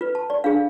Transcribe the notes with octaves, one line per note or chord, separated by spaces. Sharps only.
F4 B4
A5
D5
D4 F4 G#4 F5